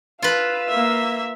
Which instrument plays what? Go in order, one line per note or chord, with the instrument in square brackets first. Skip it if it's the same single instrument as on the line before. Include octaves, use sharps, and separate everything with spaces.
[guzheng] F4 B4 [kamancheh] F5 E6
[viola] A#3 E5